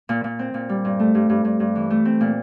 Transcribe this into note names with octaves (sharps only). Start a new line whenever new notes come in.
A#2
A#2
C4
A#2
G3
G2
A3
G2
G2
G2
G2
E3
A3
C4
A#2